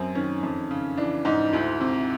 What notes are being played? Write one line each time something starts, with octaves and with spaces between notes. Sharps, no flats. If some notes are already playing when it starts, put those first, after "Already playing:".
Already playing: F#2 C4
D#3 C#4
F2
C#3
E3 D4
G#2 D#4
D2 E4
C3